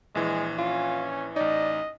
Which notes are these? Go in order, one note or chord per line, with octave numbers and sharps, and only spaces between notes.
A#1 E3 G#3
C#4 F4
A1 D#4 D5 D#5